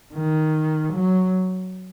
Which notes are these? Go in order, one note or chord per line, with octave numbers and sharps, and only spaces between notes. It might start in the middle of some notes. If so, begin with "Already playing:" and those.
D#3
F#3